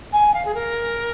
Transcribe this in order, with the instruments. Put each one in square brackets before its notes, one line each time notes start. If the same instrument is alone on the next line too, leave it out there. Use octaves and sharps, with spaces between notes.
[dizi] G#5
F5
G#4
A#4